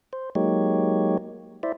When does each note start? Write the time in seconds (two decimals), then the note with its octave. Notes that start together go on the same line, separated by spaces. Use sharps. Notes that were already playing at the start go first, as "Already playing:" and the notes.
0.13 C5
0.35 F#3 G#3 A#3 D#4 G4 C#5
1.63 E4 C5 D5 E5